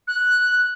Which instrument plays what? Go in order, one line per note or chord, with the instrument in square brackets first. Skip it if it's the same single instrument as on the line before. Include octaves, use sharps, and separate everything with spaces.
[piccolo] F#6